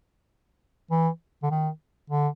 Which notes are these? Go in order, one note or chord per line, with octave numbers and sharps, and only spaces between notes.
E3
D3
D#3
D3